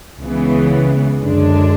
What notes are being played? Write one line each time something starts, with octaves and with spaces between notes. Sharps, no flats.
C#2 C#3 E3 B3
F#2 D3 G#3 D4